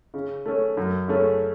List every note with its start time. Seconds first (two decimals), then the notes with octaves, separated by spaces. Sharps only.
0.14 C#3
0.46 A3 C#4
0.77 F#2
1.08 C#3 A3 C#4